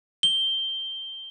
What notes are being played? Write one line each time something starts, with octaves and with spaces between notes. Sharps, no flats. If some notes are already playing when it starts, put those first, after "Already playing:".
G7